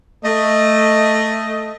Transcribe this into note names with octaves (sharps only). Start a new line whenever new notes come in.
A3 D#5